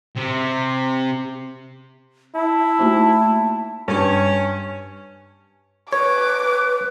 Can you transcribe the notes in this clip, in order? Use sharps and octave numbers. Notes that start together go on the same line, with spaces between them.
C3
E4 A5
A3 A#3 D#4
G2 C#4
B4 C#5 D6